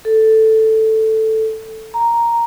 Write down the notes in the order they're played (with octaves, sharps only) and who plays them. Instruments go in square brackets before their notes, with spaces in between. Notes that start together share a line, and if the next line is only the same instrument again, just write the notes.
[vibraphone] A4
A#5